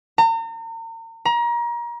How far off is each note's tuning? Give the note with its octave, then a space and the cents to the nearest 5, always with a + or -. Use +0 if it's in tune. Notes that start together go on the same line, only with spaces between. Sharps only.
A#5 -40
A#5 +30